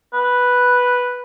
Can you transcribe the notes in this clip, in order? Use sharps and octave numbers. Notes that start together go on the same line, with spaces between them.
B4